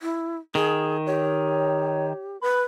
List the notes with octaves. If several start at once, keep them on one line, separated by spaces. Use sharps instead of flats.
E4
D#3 G#4
G4 C#5
B4 B5